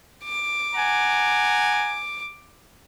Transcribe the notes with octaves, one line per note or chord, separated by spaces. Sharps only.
D6
F#5 G#5 A#5